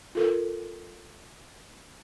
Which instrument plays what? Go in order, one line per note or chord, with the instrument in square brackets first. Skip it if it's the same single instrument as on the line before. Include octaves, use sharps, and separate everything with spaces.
[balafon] F4 A4 A#4